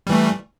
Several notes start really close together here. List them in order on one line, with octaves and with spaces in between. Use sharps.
G3 E3 A3